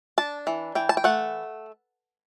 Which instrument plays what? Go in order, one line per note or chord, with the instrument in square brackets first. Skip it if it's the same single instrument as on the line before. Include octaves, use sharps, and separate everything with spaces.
[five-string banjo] D4 A5
E3
E3 G5
A5
G5
A3 F#5